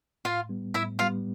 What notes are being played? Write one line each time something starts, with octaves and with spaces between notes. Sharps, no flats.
A2 F4 F5
G3 B3
A2 E4 E5
G3 B3 F4 F5